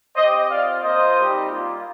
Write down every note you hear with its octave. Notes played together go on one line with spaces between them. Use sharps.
C4 G4 C5 D#5
C4 F4 D5 F5
A#3 F4 C5 D#5
G3 C4 D#4 G4
G3 A#3 F4